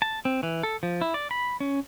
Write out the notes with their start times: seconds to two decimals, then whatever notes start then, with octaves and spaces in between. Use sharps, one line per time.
0.02 A5
0.25 C4
0.43 E3
0.63 A4
0.83 F3
1.01 E4
1.14 D5
1.31 B5
1.60 C#4